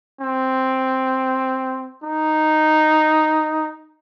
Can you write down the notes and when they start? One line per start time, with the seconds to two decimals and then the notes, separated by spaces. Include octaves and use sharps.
0.21 C4
2.04 D#4